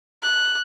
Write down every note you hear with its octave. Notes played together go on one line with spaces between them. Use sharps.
F#6